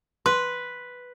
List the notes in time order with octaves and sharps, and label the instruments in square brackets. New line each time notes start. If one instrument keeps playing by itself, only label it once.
[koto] B4 [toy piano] C6